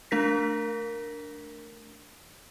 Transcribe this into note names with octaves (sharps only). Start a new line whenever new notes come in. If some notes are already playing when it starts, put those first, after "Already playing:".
A3 D4 A#4 A#6 B6